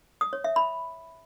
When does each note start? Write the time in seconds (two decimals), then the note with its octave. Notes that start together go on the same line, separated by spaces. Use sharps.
0.21 D#6
0.33 C#5
0.44 E5
0.56 B5